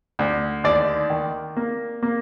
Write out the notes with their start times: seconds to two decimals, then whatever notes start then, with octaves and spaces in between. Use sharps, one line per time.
0.19 D2
0.64 D#2 D5
1.10 D#3
1.56 A#3
2.03 A#3